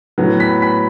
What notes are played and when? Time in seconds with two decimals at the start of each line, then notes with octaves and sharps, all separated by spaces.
0.18 A2 F#3 B3
0.40 B5 B6
0.62 B5 B6